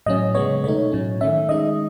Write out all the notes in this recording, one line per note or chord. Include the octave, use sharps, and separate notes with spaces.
A2 F#3 C#4 D#5
C#3 G#3 B3 C#5
B2 A3 D#4 C#5
A2 F#3 C#4
D#3 A3 C#4 E5
D#3 G#3 D#4 D#5